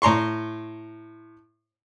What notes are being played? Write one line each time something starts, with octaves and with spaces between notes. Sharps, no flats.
A2 A#5 C6 C#6